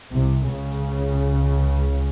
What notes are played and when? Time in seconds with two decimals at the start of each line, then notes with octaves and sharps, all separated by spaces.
0.12 C2 C3
0.52 C#2 C#3